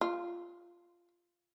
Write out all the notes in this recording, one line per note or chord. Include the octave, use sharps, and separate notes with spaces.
F4